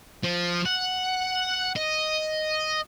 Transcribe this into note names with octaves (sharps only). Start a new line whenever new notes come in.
F3
F#5
D#5